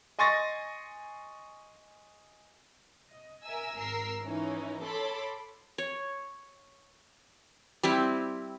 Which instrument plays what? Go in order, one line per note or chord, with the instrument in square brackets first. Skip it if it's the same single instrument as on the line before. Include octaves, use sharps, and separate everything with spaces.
[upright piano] D#5 G#5 C6 C#6 A6 A#6
[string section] D#5
A#4 E5 G#5 E6
G#1 A#4 E6 C7
E3 C#4 D#4
A4 C#5 A5 B5 C6 D6
[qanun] C#5
G3 C4 E4